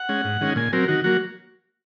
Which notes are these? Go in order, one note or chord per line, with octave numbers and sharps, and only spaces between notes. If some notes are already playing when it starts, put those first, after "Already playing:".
Already playing: F#5
G#3 C#4
G#2
D#3 G#3 C#4
A#2 G#5
F#3 C4 A#4
D#3 F#4
F#3 A#3 F#4